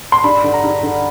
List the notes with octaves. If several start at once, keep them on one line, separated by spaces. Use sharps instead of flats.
C6
G2 B5
D3
A#5
G2
D3